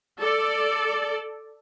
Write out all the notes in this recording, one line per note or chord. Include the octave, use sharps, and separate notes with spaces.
A4 D5